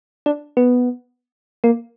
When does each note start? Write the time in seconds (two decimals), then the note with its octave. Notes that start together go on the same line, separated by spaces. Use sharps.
0.26 D4
0.57 B3
1.64 A#3